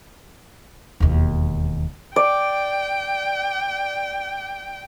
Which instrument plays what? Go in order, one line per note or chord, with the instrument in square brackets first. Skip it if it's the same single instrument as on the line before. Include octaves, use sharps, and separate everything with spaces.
[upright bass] E1 D#2
[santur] D5 [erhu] G5